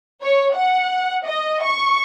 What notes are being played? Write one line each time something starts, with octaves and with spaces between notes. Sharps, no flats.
C#5
F#5
D#5
C#6